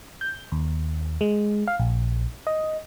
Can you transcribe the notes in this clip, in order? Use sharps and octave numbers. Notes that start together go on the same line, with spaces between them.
G6
D#2
G#3
F5
A#1
D#5